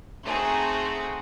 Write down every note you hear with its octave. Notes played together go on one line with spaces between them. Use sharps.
A3 C4 D#4 F#4 G#4